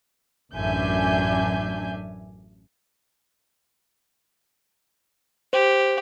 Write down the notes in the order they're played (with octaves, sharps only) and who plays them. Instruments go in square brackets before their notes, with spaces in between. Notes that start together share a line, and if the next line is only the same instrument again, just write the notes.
[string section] A1 F#2 D4 E5 G#5 G6
[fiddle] G4 [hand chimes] C5